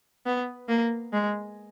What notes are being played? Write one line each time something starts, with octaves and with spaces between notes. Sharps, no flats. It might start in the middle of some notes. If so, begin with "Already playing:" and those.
B3
A#3
G#3